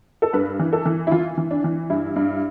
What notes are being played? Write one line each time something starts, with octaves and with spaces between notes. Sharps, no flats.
A4
G2 B4
E3
A4
E3
E4
E3 F4
E3
D4
E3
G2 E4
G2